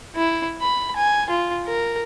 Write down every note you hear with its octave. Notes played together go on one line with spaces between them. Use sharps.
E4
B5
G#5
F4
A#4